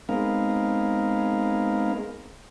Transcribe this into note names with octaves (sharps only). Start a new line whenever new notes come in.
G#3 B3 C4 D#4 A#4 F5